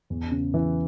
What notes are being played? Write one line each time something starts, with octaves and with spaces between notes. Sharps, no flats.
E2
C#3
E3